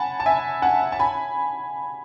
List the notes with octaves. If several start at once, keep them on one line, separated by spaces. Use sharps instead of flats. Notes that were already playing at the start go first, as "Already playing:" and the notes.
Already playing: F#5 G#5 A5 B5
A5
E5 G#5
F#5 A5
A5
G#5 B5